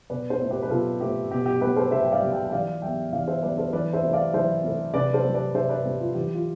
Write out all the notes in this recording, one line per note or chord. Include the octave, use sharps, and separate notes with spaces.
B2 B4 D5
A4 C5
A3 C4
G4 B4
B4
B2 F4 A4
A3 C4 G4
B2 G4
G4
G3 B3 G4 B4
A4 C5
B2 C5 E5
G5
D5 F5
G3 B3
E5 G5
G5
E3 D5 F5
G3 B3 E5 G5
E3 D5 F5
C5 E5
G3 B3 B4 D5
A4 C5
E3 B4 D5
C5 E5
A3 C4
D5 F5
E3 C5 E5
A3 C4
C3 B4 D5
A4 C5
G3 C4
B4 D5
C3 C5 E5
B4 D5
G3 C4 G4
F4
E3 G4
F4